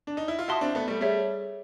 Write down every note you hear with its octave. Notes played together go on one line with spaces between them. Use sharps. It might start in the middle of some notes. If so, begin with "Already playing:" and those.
D4
D#4
E4
F4
E4 F#4 E5 A5 C6 D#6
C4 D4
A3 B3
G3 A3
G3 A3 G#4 C#5 E5